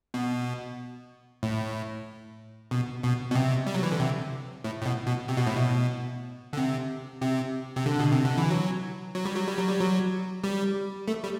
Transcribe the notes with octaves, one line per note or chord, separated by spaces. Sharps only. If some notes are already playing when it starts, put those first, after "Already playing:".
B2
A2
B2
B2
B2
C3
G3
F#3
E3
D3
C3
A2
A2
B2
B2
C3
B2
A2
B2
D3
C3
C3
C3
D3
B2
C3
D3
E3
F#3
F#3
G3
F#3
G3
F#3
G3
F#3
G3
A3
G3